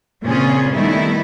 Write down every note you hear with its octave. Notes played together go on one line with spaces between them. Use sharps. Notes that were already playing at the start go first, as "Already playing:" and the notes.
A#2 C#3 C4 C#4 F4 G#4
D#3 G3 A3 B3 D#4 E4